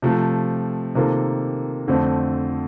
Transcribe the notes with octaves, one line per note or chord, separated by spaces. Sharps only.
C3 F3 A3
C3 D#3 A#3 F4 A4
F2 D3 A3 C4